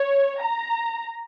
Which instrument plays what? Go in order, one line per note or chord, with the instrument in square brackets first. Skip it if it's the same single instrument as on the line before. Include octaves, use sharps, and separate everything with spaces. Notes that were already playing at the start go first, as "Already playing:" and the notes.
Already playing: [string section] C#5
A#5